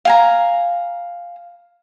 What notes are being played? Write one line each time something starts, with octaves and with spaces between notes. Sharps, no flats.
F5 G#5 A#5